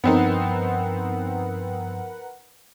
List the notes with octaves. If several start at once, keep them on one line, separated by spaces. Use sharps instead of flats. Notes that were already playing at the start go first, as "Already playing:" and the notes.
G2 F3 B3 C4 D#4 A#4 B4 F#5